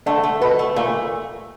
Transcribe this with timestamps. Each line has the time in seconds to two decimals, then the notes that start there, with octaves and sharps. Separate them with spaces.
0.06 D3 A3 D4
0.23 A3
0.41 B2 B3 A4
0.59 A3
0.76 A#2 A3 A#3